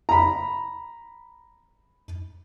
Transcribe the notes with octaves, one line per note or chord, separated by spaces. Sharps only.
A#5 B5